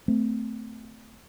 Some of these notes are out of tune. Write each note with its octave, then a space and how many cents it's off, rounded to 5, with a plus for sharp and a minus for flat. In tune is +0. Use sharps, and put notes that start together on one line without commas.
A3 +0 C4 -30